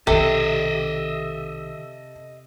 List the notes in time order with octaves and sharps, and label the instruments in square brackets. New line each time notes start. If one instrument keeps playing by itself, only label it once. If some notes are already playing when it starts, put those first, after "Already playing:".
[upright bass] B1 D#3 [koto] C3 [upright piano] A4 [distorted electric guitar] D#5 E5